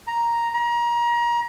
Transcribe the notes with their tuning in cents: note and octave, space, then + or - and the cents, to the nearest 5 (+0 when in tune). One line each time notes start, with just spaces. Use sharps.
A#5 +5
A#5 +30